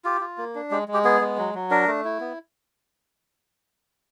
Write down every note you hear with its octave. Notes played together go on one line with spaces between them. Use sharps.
F4 G4
F4
A#3
D4
G#3 G4
G#3
G4
B3 G#4
G#3
F#3
F#3
D4 A#4
A3
E4
B3